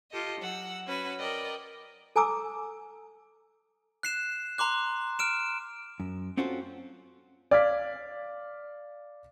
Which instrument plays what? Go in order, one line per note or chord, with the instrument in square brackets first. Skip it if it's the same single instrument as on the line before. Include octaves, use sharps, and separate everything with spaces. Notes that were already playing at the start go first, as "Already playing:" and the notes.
[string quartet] F4 G4 A4 D#5
F#3 F#5 E6
C#4 F#4 B4
A#4 D5 D#5 G5
[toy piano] A4 G#5 A#5 D6 E6
[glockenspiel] F#6 C7 E7
A#5 C6 D6 F#6
F6 D7 E7
[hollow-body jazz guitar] F#2
C4 C#4 F4 F#4 A4 C5
[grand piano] D5 F5 F6 G#6 B6